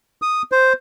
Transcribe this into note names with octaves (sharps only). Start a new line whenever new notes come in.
D#6
C5